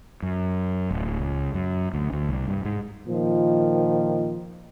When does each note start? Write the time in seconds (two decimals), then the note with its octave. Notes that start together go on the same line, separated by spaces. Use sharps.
0.22 F#2
0.91 D1
1.19 C#2
1.54 F#2
1.94 D2
2.12 D2
2.29 C2
2.48 G2
2.65 G#2
3.06 A#2 D#3 F3